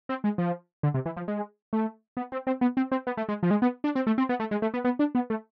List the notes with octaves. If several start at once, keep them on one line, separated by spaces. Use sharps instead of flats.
C4
G#3
F3
D3
C3
E3
F3
G#3
A3
B3
C4
C4
B3
C4
C4
B3
A3
G#3
F3
G#3
B3
D4
C4
A3
C4
B3
A3
G#3
A3
B3
B3
D4
B3
A3